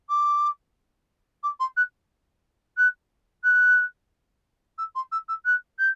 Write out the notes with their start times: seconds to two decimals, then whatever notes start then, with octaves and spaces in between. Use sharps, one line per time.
0.09 D6
1.43 D6
1.59 C6
1.76 F#6
2.77 F#6
3.43 F#6
4.78 E6
4.95 C6
5.11 E6
5.28 E6
5.45 F#6
5.78 G6